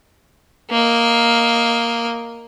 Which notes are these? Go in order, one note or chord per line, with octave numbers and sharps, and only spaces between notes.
A#3 D#5